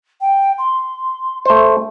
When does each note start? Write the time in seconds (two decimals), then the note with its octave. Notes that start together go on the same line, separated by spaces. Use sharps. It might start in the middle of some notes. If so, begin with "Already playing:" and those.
0.21 G5
0.58 C6
1.46 A3 C5